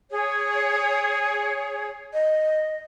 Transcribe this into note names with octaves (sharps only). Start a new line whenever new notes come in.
G#4 C#5
D#5